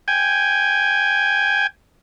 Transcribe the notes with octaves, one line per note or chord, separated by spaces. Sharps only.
G5 G#5